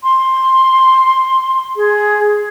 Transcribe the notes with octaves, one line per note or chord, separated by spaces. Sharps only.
C6
G#4